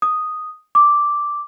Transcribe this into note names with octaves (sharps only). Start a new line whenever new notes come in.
D#6
D6